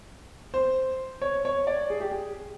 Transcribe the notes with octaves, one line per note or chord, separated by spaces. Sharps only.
C5
C#5
C#5
D5
G#4
G4
G#4